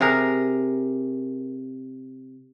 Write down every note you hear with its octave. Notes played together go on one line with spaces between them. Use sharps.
C3 G#4 A#4